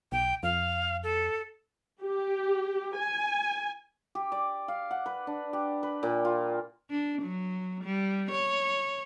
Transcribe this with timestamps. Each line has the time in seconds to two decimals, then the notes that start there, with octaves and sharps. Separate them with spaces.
0.12 B1 G5
0.43 F2 F5
1.03 A4
2.02 G4
2.97 G#5
4.15 G4
4.32 D5
4.68 F5
4.91 F#5
5.06 B4
5.27 D4
5.53 G4
5.83 B4
6.03 A#2
6.25 F4
6.91 D4
7.22 F#3
7.84 G3
8.32 C#5